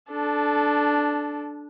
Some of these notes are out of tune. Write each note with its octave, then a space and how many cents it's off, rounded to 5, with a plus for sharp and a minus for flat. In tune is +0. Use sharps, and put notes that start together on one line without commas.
D4 +0 A4 -20